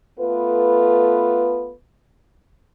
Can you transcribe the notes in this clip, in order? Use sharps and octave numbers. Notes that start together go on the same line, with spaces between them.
A3 B3 F4 A4 B4